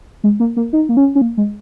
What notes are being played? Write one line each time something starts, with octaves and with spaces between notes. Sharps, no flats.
G#3
A#3
A#3
D#4
A#3
C#4
C#4
A#3
G#3